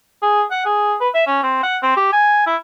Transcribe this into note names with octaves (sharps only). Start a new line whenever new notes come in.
G#4
F#5
G#4
B4
E5
C#4
C4
F#5
C4
G4
G#5
E4